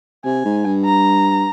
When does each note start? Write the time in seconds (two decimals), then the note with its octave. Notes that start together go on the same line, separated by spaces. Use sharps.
0.25 C3 G#5
0.45 G#2
0.65 G2
0.85 A#5